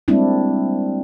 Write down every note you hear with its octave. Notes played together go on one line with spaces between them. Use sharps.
G3 G#3 A#3 C4 D4 E4